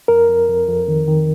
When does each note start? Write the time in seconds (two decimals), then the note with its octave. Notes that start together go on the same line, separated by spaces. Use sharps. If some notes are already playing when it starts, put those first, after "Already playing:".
0.08 F2 A#4
0.28 F2
0.48 F2
0.68 F2
0.88 D#3
1.07 D#3